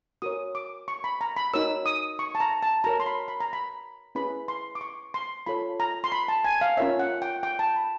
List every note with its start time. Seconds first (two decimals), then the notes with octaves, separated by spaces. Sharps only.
0.22 F#4 A#4 C#5 D#6
0.55 D6
0.88 C#6
1.04 B5
1.21 A#5
1.37 B5
1.53 D#4 F#4 A#4 C#5 E6
1.86 D#6
2.19 C#6
2.35 A5
2.40 A#5
2.63 A5
2.84 F#4 A#4 C#5 A#5
3.00 C6
3.06 B5
3.28 B5
3.40 A#5
3.53 B5
4.15 C#4 E4 G#4 B4 B5
4.48 C6
4.75 D6
4.81 C#6
5.14 C6
5.46 F4 A4 C#5 B5
5.80 A#5
6.04 C6
6.12 B5
6.28 A5
6.45 G#5
6.61 F5
6.77 C#4 F4 A#4 C#5 E5
6.99 F#5
7.22 G5
7.43 G5
7.59 A5
7.76 B5